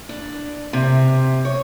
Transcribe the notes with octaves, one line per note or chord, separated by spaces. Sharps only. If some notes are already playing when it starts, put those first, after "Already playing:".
D4
C3
C#5